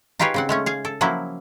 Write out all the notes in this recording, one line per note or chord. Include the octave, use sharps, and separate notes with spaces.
D#4 F4 G4 G#4 B4 C#5
C#3 C4 F#5
G#3 A3 C#4
G#4 F5
A4
F3 F#3 A#3 C#4 E4 F#4